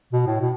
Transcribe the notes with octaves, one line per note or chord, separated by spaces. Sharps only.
B2
A2
B2